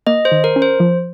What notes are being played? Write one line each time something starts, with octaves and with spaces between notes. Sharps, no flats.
A#3 D#5
C5
D#3
A#4
C#4
C5
F3